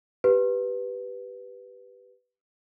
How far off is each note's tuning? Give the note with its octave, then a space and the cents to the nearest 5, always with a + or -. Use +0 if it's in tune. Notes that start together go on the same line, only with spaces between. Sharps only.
G4 -5 B4 +0